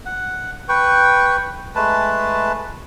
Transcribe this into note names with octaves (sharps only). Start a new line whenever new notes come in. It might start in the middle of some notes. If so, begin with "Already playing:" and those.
F#5
B4 G5 C#6
G#3 A3 B4 A5